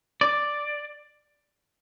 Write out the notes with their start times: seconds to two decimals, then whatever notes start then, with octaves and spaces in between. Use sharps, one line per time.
0.21 D5